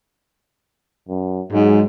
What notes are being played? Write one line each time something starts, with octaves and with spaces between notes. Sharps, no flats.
F#2
G#2 F#3 G#3